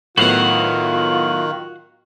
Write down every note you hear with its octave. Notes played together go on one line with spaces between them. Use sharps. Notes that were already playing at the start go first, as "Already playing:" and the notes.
A2 D#3 F#3 B3 F4 F#4 F5 F#5